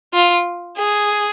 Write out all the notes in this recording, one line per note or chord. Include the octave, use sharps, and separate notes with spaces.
F4
G#4